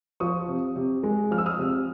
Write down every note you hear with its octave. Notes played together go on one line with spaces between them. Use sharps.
F3 C#6 D#6
C3
C3
G#3
F3 F6
E6
D#6 F6
C3